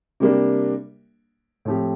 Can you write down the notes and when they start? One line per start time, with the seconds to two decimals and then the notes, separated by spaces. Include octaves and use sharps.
0.20 C3 G3 A#3 D4
1.65 A2 F3 C4 G4